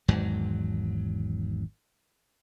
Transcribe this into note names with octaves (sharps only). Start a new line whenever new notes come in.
G#1 E2 G#2 F#3